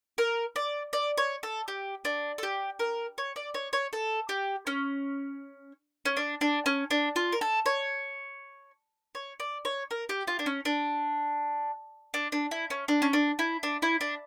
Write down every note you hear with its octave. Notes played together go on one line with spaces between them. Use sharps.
A#4
D5
D5
C#5
A4
G4
D4
A4
G4
A#4
C#5
D5
C#5
C#5
A4
G4
C#4
C#4
D4
D4
C#4
D4
F4
A#4
A4
C#5
C#5
D5
C#5
A#4
G4
F4
D4
C#4
D4
D4
D4
E4
C#4
D4
C#4
D4
E4
D4
E4
D4